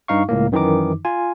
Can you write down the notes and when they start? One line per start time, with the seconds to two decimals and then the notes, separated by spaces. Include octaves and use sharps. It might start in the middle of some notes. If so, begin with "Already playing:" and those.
0.08 G2 D#4 F5 C#6
0.29 C#2 A2 A#3
0.52 F#2 D#3 E3 D#4 D6
1.05 F4 G#5